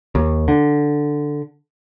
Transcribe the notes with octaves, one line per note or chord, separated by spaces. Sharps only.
D#2
D3